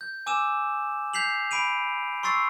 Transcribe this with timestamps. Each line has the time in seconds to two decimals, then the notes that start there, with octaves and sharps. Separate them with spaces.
0.01 G6
0.26 G#5 D6 E6 E7
1.14 G6 B6 C7 F7 F#7
1.51 B5 D7 D#7 F7
2.23 C6 C#6 E6 A6 C7